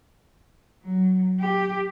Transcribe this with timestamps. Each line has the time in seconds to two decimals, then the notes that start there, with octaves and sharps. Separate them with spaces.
0.83 F#3
1.40 G4